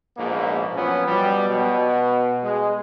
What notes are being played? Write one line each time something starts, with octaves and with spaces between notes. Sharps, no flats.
A#1 G#2 B2 A#3
F3 F#3 B3 C#4
B2 F#3 G3
B2
G#3